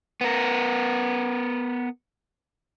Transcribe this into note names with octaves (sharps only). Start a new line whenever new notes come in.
B3 A#4